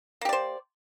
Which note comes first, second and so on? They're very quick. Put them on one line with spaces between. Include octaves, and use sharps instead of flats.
A#3 G4 D5 C5